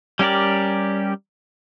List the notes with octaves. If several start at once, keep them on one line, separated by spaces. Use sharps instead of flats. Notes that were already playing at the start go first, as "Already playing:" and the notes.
G3 C#4 G4 A#4 D5